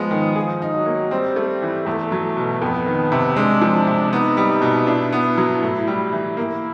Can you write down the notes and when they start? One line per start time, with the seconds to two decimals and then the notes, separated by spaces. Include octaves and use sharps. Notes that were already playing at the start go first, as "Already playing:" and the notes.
Already playing: F3 G#3 B3
0.11 D#3
0.36 F3 G#4
0.62 D#4
0.74 F#3
0.86 A#3
1.11 G3 C4
1.36 A3
1.62 E3
1.86 E2 A3
2.12 F#3
2.37 B2
2.62 F2 B3
2.86 D#3
3.12 C3
3.36 G#3 D4
3.61 F3
3.87 C3
4.13 B3 D#4
4.37 G3
4.62 B2
4.87 D4 E4
5.13 B3
5.37 F#3
5.63 A2
5.87 G3
6.12 E3
6.37 A#3 E4